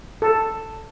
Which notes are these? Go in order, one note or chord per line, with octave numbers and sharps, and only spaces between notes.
A4